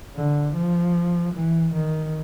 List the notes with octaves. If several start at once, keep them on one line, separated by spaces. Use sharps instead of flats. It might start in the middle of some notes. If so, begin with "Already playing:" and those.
D3
F3
E3
D#3